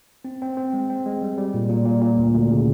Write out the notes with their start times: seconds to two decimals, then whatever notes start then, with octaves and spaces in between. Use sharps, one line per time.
0.25 C4
0.42 C4
0.57 C4
0.74 G#3
0.90 C4
1.06 G#3
1.22 G3
1.38 G3
1.54 A#2
1.69 A#2
1.85 A#2
2.02 A#2
2.18 D2
2.35 D2
2.51 C#3